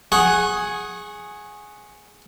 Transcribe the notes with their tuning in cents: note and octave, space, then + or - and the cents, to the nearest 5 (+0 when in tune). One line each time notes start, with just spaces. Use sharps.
G#4 +0 F#5 +10 C#6 -25